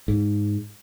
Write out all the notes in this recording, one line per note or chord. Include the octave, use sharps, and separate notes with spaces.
G#2